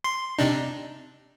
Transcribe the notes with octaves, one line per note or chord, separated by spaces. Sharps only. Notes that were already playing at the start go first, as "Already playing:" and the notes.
C6
C3 D4 D#4